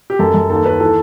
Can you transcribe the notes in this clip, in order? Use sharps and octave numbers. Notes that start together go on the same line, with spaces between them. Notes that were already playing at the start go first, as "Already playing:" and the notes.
G4
F#2 A4
F#2
D#2 A4
D#2 B4
E3 A4